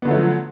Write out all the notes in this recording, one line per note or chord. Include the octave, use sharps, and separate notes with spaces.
D3 F3 F#3 A3 B3